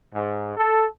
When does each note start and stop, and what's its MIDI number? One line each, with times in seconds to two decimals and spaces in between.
0.14 0.53 44
0.57 0.86 69